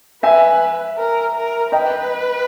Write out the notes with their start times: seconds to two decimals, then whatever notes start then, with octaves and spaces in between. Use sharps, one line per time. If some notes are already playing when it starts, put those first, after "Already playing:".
0.23 B4 E5 G#5
0.98 A#4
1.35 A#4
1.72 B4 D#5 G5